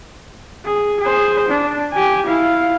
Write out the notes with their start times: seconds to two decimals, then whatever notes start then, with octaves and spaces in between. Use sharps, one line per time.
0.65 G#4
1.00 G#4 C5
1.49 D4
1.92 G4 G#5
2.27 E4 F5